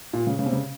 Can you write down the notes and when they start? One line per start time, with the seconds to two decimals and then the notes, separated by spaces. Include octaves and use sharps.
0.13 A#2
0.27 C#3
0.39 C#3
0.46 C3
0.53 C#3